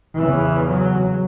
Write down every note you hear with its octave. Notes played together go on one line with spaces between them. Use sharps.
E2 C#3 E3
F#3